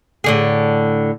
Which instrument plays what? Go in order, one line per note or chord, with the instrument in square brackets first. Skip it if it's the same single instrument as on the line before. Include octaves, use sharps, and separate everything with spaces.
[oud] A2 D3 G#4